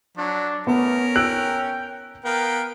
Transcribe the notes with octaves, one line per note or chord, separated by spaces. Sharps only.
F#3 D4
A3 B3 C#4 A#4
G5 E6 F#6 D7
B3 A#4 F5 G5